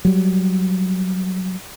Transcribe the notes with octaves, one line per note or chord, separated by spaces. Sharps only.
F#3 G3